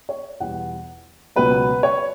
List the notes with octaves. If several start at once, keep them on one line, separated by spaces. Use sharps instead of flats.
C#5
E2 B2 G3 B3 F#5
C#2 B2 F#3 B3 B4
C#5